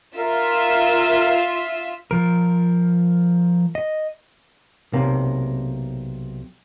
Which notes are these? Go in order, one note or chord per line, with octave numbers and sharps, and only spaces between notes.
F4 A#4 E5
F3 A#4
D#5
B1 C3 A#3